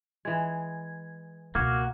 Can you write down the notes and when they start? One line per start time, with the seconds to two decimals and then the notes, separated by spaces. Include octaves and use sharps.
0.25 E3 G#3 G#6
1.55 C#2 B2 A#3 F#4 D6 F6 G#6